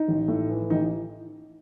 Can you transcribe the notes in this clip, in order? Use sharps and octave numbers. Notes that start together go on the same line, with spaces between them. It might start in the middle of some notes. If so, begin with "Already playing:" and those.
Already playing: D#4
A1
A2
E3
A1 D#4